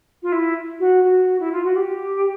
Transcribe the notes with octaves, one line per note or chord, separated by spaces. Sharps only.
F4
E4
F#4
F#4
E4
F4
F#4
G4